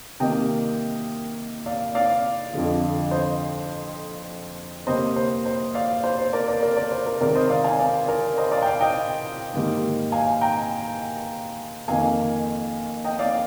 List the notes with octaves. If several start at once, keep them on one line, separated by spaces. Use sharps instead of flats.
C3 D#3 G3 A#3 D#5 G5
D5 F5
D5 F5
F2 D3 F3
C5 D#5
C3 G3 A#3 C5 D#5
C5
C5
D5 F5
C5
C5
A#4 D5
A#4 D5
A#4 D5
A#4 D5
C5
A#4
C3 D#3 G#3 A#4 D5
C5 D#5
D5 F5
F5 G#5
D5 F5
A#4 D5
C5 D#5
D5 F5
G5
D5 F5
D#5 G5
G#2 D#3 G3 A#3
F5 G#5
G5 A#5
F2 D#3 A#3 F5 G#5
D#5 G5
D5 F5